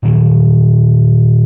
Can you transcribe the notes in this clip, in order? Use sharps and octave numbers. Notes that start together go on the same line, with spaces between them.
A#2 D#3 F#3 A#3